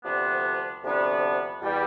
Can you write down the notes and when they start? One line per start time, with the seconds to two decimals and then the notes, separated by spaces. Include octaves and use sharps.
0.04 D2 C3 F3 B3 D4
0.83 D2 C3 F3 B3 D4
1.60 E2 B2 G3